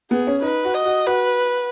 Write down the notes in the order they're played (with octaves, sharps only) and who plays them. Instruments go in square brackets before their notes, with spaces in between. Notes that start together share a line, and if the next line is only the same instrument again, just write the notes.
[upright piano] B3 [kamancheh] G#4
[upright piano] C#4
[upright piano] D#4 [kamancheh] B4
[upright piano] F#4
[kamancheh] D#5
[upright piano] F#4
[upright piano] F#4 [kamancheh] B4